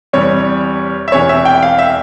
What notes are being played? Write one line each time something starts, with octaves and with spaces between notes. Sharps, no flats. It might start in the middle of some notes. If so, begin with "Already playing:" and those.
E2 C3 G3 C#5
E5
E1 E2 C3 E3 C#5
E5
G5
F5
E5